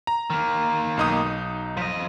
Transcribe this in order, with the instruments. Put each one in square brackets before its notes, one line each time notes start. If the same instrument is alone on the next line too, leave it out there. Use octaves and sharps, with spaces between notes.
[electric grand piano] A#5
[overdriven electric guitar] D#3 A#3
[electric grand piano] B1 D#4 D#6
[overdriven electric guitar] F3 D#5